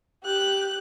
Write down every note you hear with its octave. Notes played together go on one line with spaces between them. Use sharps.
G4 F#6